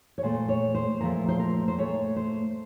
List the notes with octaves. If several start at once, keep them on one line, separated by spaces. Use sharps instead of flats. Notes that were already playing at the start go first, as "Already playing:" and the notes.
C#5
A#2 A3 C5
C#5
C5
A#2 F3 A3 A#4
C5
A#4
C5
A#2 A3 C#5
C5